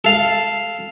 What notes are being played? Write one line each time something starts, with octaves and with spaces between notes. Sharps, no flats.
A4 F5